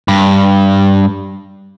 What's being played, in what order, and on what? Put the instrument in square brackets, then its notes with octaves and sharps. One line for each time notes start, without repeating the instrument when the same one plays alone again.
[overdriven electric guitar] G2